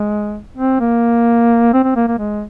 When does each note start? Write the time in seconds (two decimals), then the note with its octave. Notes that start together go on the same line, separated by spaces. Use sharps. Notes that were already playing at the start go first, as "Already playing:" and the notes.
Already playing: G#3
0.57 C4
0.80 A#3
1.73 C4
1.84 C4
1.96 A#3
2.08 A#3
2.19 G#3